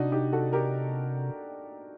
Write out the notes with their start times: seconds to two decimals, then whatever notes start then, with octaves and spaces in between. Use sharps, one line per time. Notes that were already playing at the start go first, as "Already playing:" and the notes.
Already playing: C3 D4 D#4 F#4
0.12 D#4 G4
0.33 F#4 A4
0.53 G4 A#4